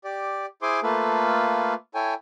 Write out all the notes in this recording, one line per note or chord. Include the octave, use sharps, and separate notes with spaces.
G4 D5
E4 G#4 C5 G#5 C6 D6
A3 A#3 F4 A4 B4
E4 A4 C#5 G5 G#5